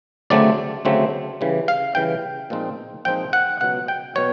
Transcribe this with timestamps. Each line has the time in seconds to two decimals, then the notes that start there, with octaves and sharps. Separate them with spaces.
0.30 D2 C#3 F#3 A3 C4 D5
0.85 D2 C#3 F#3 A3 C4
1.41 C#3 E3 G3
1.68 F5
1.95 C#3 E3 G3 G5
2.50 A#2 F3 G#3 C4 D#4
3.05 A#2 F3 G#3 C4 D#4 G5
3.33 F#5
3.60 C#2 B2 F#3 F#5
3.88 G5
4.15 B2 F#3 C#5